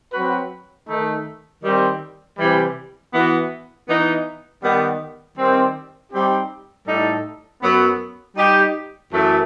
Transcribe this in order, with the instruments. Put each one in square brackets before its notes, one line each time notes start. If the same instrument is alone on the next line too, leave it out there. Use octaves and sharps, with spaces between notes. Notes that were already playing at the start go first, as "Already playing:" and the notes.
[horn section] F#3 C4 F#4 B4
D#3 A3 D#4
D#3 G3 C4
C3 E3 G3
E3 B3 F#4
E3 B3 D#4
D#3 G3 B3
D#3 G3 C4
G3 C4 D#4 G4
A2 G3 D#4 A4
F#2 F#3 B3
G3 D#4 G4
F#2 E3 A3